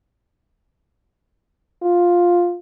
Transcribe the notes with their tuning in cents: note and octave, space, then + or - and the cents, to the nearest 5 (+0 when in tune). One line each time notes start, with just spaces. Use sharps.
F4 +5